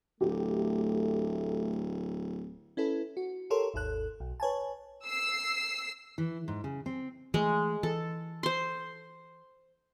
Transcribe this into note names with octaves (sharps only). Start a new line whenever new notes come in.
D1 A3 G4
C#4 E4 A4 B4
F#4
G4 A4 A#4 C#5 C6
G#1 D#2 A4 F#6
B1
B4 C#5 G#5 A5
E6 C7
E3
G#2
C#3
C4
E3 G#3 A3
E3 A4
C5 C6